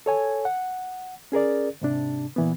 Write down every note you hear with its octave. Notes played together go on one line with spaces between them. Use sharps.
A4 C#5 G#5
F#5
C#4 G#4 A#4 D5
G#2 C3 D4
A#2 E3 B3